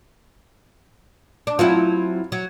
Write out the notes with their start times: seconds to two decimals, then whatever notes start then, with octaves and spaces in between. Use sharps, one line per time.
1.47 D4
1.59 F#3 C4 E4 F4
2.32 F#3